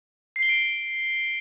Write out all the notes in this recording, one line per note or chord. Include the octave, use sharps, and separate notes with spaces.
C7
G7
D7